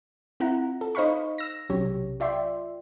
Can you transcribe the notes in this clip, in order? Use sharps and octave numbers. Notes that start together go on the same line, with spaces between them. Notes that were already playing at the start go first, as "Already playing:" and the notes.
C4 E4 F4 F#5 A#5
A4
D#4 C5 D#5 F5 B5 C#6
E6 A#6
B1 C3 F#3 C#4 G4 C#5
F4 D5 E5 G5 C6